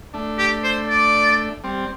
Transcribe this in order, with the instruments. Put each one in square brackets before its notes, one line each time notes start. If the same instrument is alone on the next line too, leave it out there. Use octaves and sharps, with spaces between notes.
[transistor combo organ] A3 D4
[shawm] G4
C5
D5
[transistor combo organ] G3 C4